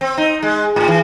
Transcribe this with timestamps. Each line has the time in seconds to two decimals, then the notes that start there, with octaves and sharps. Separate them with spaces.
0.01 C4
0.17 D#4
0.43 G#3
0.76 A2
0.88 E3